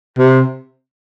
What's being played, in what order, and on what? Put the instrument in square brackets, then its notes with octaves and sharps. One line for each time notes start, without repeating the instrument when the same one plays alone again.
[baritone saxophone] C3